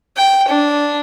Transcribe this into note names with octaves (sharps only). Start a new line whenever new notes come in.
G5
D4